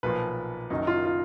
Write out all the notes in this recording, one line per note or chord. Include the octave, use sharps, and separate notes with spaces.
B1 A#2 F3 B4
F#1 F#2 D#3 F#3 D#4
F4
F4